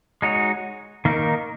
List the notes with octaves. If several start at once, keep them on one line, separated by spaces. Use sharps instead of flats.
G#3 D#4 F#4 C#5
D#3 A#3 D#4 A#4